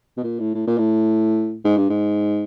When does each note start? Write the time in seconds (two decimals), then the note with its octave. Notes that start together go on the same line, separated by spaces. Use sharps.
0.17 B2
0.24 A#2
0.39 A2
0.55 A2
0.67 A#2
0.78 A2
1.65 G#2
1.77 G2
1.89 G#2